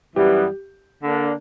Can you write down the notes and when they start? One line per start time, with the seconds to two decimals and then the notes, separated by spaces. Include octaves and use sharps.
0.16 F#2 E3 G3 B3 G4
1.03 D3 A#3 D4